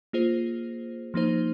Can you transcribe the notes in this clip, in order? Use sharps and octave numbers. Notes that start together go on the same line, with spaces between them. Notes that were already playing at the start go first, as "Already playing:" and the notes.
A#3 F4 G#4 C5
F3 A#3 D#4 C5